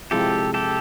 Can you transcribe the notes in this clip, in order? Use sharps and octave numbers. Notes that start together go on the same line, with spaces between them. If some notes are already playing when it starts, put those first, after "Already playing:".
C3 F3 G#3 C4 E4 G4 A4
G4 A4